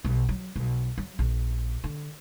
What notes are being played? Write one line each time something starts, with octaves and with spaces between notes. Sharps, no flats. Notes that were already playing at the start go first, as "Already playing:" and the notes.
B1
F#3
B1
F#3
A#1
D3